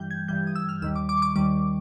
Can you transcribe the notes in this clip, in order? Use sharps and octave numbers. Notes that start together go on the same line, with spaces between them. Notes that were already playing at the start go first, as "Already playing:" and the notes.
Already playing: G2 E3 G3 G6
G#6
G2 E3 G3 G6
D#6
E6
F6
D#2 D#3 G3 E6
D6
D6
C#6
D6
D#2 D#3 G3 D6